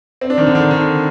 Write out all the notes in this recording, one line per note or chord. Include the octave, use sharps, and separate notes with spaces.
C4
D4
D#3
D3
D#3
D3